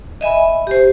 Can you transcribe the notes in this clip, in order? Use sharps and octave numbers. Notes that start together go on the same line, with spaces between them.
D#5 E5 G#5 B5
E5
G4 C5